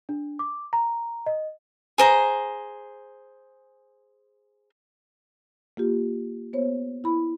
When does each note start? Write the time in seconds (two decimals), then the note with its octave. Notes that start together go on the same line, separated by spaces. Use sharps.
0.09 D4
0.39 D6
0.73 A#5
1.26 D#5
1.98 G#4 C5 A#5
5.77 A#3 F4 G4
6.53 B3 C5 C#5
7.04 E4 B5